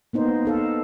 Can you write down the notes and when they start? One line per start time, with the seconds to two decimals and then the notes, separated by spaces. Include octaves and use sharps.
0.13 A#3 B3 D#4 C5
0.45 D#4 A4 F5